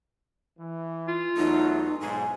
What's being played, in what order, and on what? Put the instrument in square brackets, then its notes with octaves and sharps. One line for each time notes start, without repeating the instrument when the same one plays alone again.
[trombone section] E3
[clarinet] F4
[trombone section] E2 F#3 A3 [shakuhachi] D#4
[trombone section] B1 G#2 [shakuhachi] G#5